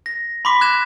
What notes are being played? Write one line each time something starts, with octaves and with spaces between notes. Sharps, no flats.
A#6
B5 C6 D6 B6
F#6 G#6 E7